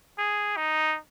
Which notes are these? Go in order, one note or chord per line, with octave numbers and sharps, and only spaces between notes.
G#4
D#4